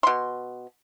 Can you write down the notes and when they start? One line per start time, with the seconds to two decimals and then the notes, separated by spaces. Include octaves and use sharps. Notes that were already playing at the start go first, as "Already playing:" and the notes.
0.03 B2 C6